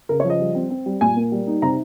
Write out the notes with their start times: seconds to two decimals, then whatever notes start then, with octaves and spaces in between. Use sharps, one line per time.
0.09 C#3 A#4
0.20 C#5
0.24 F3
0.30 D#5
0.40 G3
0.55 C4
0.70 C4
0.86 G3
1.01 A#2 G#5
1.16 A#3
1.32 G3
1.47 D#4
1.62 C3 A#5